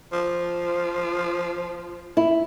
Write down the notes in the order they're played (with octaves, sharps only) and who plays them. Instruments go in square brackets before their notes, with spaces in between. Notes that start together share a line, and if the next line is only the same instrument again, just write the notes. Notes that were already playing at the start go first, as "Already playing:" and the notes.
[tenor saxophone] F3
[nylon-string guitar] E4